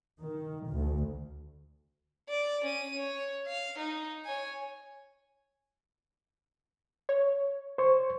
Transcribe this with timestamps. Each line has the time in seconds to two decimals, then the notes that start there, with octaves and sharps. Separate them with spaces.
0.19 D#3
0.68 D2
2.29 D5
2.64 C#4 D#7
2.96 C#5
3.47 F5
3.78 D#4
4.25 C#5 G#5
7.09 C#5
7.78 C5 C#6